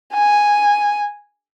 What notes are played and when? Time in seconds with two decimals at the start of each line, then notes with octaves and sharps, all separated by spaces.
0.14 G#5